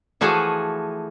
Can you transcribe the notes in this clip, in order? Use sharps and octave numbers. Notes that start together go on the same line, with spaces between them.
E3 F3 A3 F#4 G#4